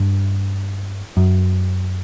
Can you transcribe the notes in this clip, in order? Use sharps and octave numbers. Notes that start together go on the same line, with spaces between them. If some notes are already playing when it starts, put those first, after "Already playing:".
Already playing: G2
F#2